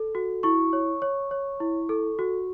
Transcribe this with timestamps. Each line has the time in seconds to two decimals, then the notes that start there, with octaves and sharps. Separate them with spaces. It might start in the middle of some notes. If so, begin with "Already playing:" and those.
Already playing: A4
0.15 F#4
0.43 E4 C#6
0.73 C#5
1.02 C#5
1.31 C#5
1.60 E4
1.89 A4
2.19 F#4